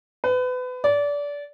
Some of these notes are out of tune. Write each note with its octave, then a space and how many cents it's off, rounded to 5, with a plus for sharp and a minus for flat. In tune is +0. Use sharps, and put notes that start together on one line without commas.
B4 +30
D5 -25